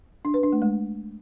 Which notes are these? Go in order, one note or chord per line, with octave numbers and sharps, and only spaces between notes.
D4
B4
D4
A3
G#3